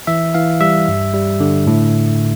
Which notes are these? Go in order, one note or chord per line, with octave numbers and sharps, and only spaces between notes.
E3 E5
E3 F5
G3 E5
G2
G3
D3
A2